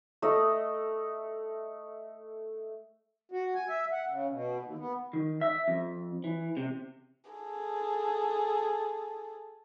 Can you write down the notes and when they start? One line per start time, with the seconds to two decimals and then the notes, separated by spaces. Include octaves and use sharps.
0.22 A3 D#5
3.32 F#4
3.55 G#5
3.69 E5
3.92 F#5
4.09 C#3
4.30 B2
4.62 D#2
4.78 B3
5.13 D#3
5.41 E5
5.68 F2
6.24 E3
6.57 C3
7.30 G#4 A4